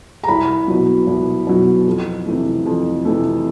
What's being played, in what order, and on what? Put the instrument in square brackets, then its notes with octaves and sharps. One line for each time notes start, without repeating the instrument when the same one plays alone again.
[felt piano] A#5
C2 B5
B2 F#3
C2
B2 F#3
F2
C3 E3 A3
F2
C3 E3 A3